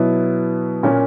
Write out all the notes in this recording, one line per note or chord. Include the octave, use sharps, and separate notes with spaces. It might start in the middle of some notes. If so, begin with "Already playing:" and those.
Already playing: B2 F#3 B3 E4
A#2 A#3 C#4